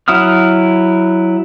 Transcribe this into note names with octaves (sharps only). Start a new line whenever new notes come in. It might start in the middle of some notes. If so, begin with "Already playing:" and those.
F#3 E4 F#5 D#6 F6